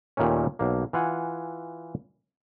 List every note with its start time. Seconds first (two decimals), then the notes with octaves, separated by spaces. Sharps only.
0.17 D#2 A#2 D#3 A3 C#4
0.59 B1 A#3
0.93 E3 F4 F#5 G#5